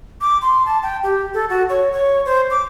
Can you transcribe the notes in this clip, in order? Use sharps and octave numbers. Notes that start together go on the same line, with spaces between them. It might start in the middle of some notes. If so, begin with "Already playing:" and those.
D6
C6
A5
G5
G4
A4
F#4
C#5
C#5
C5
D6